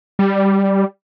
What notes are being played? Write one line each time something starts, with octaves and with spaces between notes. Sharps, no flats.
G3